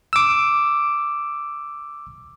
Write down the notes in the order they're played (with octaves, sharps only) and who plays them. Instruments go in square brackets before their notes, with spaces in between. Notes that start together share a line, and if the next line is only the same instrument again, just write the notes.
[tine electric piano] D6 E6